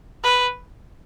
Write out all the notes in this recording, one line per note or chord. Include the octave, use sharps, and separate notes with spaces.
B4